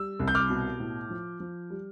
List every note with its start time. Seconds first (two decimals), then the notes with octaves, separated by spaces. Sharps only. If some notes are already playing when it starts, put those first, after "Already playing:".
Already playing: G3 E6
0.20 C2
0.28 G6
0.35 D6 F6
0.50 B2
0.80 A2
1.10 F3
1.40 F3
1.70 G3